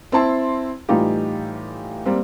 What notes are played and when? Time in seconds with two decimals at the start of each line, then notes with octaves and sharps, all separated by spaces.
0.12 C4 E4 A5 C6
0.89 A2 E3 G3 D#4 F4 G4
2.05 G3 A#3 C4